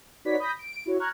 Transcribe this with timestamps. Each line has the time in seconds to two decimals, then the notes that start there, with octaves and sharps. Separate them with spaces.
0.25 D#4 F#4 B4 C#5 D5 B6
0.39 B5 D#6 G6 A#6 B6
0.59 D7
0.86 E4 F#4 C#5
1.00 A#5 C#6 F6 F#6 G#6